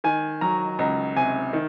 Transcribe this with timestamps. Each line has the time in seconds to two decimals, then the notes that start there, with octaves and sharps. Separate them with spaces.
0.04 D#3 G#5
0.41 F#3 A#5
0.79 C#2 A#5
1.16 C3 G#5
1.53 D#3